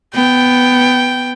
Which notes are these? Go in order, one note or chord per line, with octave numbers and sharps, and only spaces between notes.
B3 G5